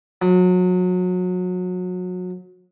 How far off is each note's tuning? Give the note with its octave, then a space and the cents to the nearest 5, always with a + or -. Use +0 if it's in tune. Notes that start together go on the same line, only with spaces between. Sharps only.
F#3 -30